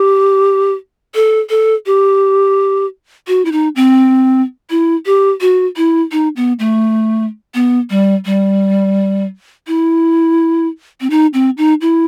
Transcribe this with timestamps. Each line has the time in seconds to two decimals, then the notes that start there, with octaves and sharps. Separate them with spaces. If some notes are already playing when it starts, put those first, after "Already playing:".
Already playing: G4
1.15 A4
1.50 A4
1.86 G4
3.27 F#4
3.45 E4
3.52 D#4
3.76 C4
4.70 E4
5.06 G4
5.41 F#4
5.77 E4
6.12 D#4
6.36 B3
6.59 A3
7.55 B3
7.90 G3
8.25 G3
9.67 E4
11.01 C4
11.10 D#4
11.34 C4
11.58 D#4
11.81 E4